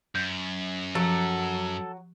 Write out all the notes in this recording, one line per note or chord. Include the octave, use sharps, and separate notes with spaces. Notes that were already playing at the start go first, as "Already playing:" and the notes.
F#2 G6
F3 F#3 A4